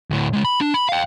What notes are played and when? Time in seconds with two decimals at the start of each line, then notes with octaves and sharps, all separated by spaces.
0.11 D2 A2
0.33 C#2 G#3
0.45 B5
0.61 D4
0.74 B5
0.89 F5 G5